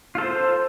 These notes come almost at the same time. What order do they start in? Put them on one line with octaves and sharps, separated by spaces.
F4 A4 C5